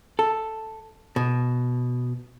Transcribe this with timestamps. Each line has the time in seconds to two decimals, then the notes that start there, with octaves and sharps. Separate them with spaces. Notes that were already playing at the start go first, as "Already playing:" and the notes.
0.19 A4
1.16 B2